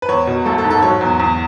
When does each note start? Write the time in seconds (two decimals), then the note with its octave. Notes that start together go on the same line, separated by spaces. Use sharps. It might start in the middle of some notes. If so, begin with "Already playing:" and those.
0.02 B4
0.09 E2 C#5
0.27 B2
0.46 A1 A4
0.58 A4
0.64 G#2
0.70 A4
0.82 F#3 C#5
1.01 E2
1.20 E2